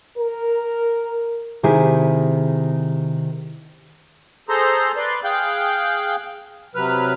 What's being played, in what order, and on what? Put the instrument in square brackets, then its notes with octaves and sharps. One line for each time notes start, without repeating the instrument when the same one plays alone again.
[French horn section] A#4
[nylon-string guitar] C3 D#3 E4 G4 G#4
[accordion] G#4 A4 C5 A#5 C6
B4 D5 C6
G#4 F5 G5 F#6 G6
C3 F#3 B4 F6